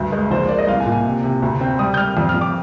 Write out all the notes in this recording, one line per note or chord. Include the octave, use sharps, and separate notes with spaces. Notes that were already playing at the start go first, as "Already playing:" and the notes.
Already playing: D2 G2
G#3
A#1 C5
A#3 D5
D#5
C2 F5
G#5
A#2
G#5
C3
C3
D2
C4
G3 D#6
G6
G3 F6
F2
F6
F2
D6